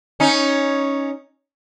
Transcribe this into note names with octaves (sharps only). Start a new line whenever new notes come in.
C#4 D#4